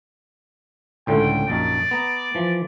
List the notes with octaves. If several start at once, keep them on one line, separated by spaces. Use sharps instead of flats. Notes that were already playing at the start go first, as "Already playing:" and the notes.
C#2 A2 D3 G5
A#1 F#2 D#4 D5
B3 A#5
E3 F3